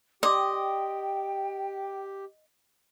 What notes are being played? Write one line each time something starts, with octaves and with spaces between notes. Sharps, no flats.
G4 D5 D#5 G5 C6 D6